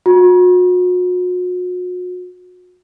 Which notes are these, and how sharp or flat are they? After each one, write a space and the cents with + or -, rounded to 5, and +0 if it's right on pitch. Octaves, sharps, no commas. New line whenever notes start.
F#4 -40